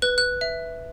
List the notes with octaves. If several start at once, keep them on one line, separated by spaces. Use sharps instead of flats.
B4 F#6
F#6
E5